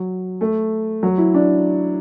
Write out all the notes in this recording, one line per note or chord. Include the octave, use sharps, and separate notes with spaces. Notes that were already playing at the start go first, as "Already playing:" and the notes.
Already playing: F#3
A3
F#3
E4
D4